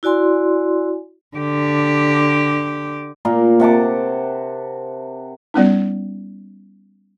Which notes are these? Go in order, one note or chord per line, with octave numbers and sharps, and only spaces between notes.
E4 F#4 D5 G#5 C6
D3 G4
A#2 A#3
C3 F#5 A5 D6
G3 B3 C#4 D#4